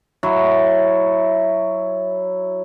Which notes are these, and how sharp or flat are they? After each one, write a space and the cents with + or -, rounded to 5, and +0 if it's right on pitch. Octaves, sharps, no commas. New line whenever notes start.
F#3 +0 E4 +0